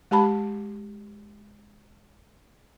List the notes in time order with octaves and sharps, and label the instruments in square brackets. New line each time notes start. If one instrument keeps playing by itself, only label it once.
[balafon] G#3 G4 A5 B5